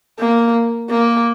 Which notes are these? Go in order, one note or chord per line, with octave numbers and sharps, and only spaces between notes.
A#3
A#3